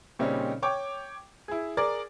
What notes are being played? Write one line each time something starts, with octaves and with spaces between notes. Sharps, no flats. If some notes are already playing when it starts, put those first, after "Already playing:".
A#2 C#3 G3 C4 C#4 D#4
C#5 G5 D6
E4 G#4
G#4 A#4 D5